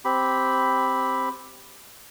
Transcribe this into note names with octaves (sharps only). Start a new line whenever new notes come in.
C4 G4 B5